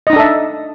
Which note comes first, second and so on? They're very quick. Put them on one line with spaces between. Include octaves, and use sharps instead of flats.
D#5 D#4 D4 A4 E5